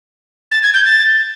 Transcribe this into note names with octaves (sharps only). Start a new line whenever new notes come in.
A6
G#6
G6
A6